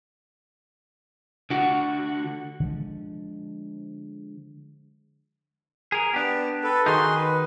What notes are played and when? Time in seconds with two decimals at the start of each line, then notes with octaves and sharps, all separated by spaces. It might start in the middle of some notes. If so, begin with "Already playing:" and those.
1.50 D3 F#4
2.60 D3 F3 G#3
5.92 G#4 A#4
6.14 B3 D4 G4
6.64 A4 B4
6.86 D#3 D#4 F#4 G#4 C6
7.15 B4